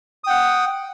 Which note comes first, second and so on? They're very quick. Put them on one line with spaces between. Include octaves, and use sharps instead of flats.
D#6 G5 F#5